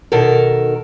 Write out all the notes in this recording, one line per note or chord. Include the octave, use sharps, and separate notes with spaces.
B2 D#3 A4 A#4